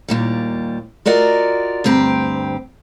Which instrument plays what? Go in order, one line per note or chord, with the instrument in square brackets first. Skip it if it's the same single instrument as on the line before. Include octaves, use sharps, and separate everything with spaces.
[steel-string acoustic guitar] D#2 A#2 G3
F4 F#4 A#4 D5 D#5
D2 G2 C4 G4 A#5